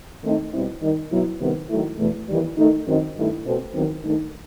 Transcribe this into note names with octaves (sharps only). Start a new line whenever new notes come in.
D#3 A3 C4 D#4
B2 G3 C4 E4
D#3 G3 D#4
B2 F#3 B3 E4
C3 D#3 G3 B3
D#3 F#3 A3 E4
E2 B2 A3
E2 D#3 G3
D#3 A3 D#4
F#2 D#3 F#3 C4 D#4
G2 D#3 A3 E4
B2 A3 C4
E2 D#3 F#3 C4
G2 D#3 A3 D#4